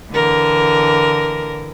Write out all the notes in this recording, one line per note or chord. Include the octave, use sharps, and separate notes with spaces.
D3 E3 A#4